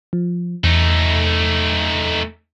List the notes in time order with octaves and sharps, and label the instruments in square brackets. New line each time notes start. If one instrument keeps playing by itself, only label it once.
[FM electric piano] F3
[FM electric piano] E2 [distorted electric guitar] A3 D#4